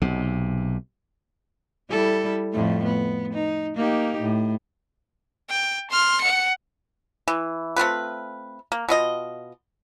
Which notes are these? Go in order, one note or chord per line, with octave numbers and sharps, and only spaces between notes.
B1 C3
G3 E4 A4
F2 A2 A3
B3
D#4
A#3 D#4 G4
A2
G5
C6 F6
F#5 C#7
E3
A3 C4 F4 B4
A#3
B2 F4 D#5